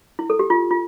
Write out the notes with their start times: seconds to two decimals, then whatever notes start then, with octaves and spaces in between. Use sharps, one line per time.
0.19 E4
0.30 A4
0.39 G4
0.50 F4
0.71 F4